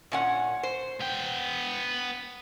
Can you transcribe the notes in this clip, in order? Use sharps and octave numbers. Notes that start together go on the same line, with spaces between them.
A#2 C#4 F#5
C5
B3 G5